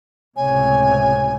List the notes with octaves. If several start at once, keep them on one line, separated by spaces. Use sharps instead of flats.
C#2 A2 C3 C#5 G#5